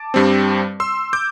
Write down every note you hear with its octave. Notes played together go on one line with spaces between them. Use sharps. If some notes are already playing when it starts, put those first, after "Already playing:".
Already playing: A5 D6
G2 G3 C4
C6 E6
D6 G6